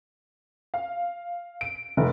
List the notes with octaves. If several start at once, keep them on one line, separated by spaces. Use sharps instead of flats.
F5
D7
F1